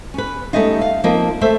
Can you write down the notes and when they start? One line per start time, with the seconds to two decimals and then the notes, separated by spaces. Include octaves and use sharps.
0.14 C#4 B4
0.53 G3 A3 B3 C#4 D#4 F4
0.81 F5
1.04 F3 A#3 C4 D#4 F4
1.41 A3 C5 E5